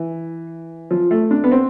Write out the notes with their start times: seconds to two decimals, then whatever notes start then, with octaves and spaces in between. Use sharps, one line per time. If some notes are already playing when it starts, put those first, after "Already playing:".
Already playing: E3
0.91 F3
1.11 A3
1.31 D4
1.44 B3
1.52 C4